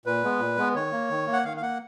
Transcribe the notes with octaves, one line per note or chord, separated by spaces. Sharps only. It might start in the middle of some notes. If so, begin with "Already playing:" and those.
A#2 B4
G#3 B3
A#2
G#3 B3
D#3 C#5
A#3
D#3
A#3
F#5
D#3 F5
F5
A#3 F#5